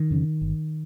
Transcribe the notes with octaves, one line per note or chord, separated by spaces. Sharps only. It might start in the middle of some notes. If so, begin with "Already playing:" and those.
Already playing: D#3
F2 C#3
G1